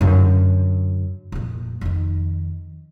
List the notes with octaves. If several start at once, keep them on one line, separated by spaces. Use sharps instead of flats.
F#2 D3
F2 A#2
F2 D#3